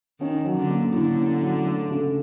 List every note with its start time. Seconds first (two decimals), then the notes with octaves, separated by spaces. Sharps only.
0.21 D#3 C#4
0.45 F#3
0.57 D3
0.69 A#3
0.93 A2 D3
1.18 C#4
1.42 F#3
1.67 A3
1.91 C#3